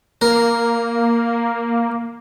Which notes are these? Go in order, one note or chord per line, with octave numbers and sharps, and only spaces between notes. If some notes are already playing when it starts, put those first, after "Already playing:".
A#3 A#4